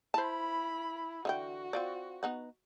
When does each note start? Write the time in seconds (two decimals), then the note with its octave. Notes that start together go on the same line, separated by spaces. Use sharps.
0.14 E4 C5 A5 B5
1.25 D3 E3 F#4 G5
1.73 C4 F4 D5
2.23 B3 D#4 F#5